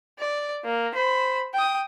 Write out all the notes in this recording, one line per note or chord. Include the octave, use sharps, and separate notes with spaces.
D5
A#3
C5 B5
G5 D#6